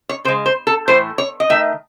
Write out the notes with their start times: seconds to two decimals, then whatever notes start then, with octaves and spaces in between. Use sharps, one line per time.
0.09 C#5
0.25 C#3 C5
0.28 G#3
0.46 C5
0.67 A4
0.88 A2 E3 A3 C5
1.18 C#5
1.40 D#5
1.50 D#3 A3 E5